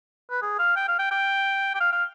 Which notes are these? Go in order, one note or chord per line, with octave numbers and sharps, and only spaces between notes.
B4
G#4
F5
G5
F5
G5
G5
G5
F5
F5